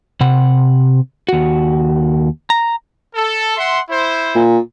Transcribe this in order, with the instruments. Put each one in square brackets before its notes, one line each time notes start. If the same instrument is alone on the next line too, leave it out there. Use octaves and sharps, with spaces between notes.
[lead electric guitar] C3 F#5
D#2 F#4
A#5
[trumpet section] A4
E5 F#5 C6
E4 C5
[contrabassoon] A#2